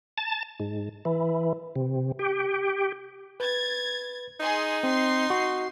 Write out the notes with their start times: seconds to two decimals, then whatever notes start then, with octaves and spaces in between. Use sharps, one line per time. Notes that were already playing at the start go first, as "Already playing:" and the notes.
0.18 A5
0.60 G#2
1.05 E3
1.76 C3
2.19 G4
3.40 B4 G#6 A6
4.40 D#4 G#4 G#5 C6
4.83 C4 C6 C7
5.30 F#4